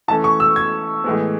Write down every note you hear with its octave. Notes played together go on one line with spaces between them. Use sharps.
E3 A3 C#4 A5
C#6
E6
G#6
A2 E3 G#3 B3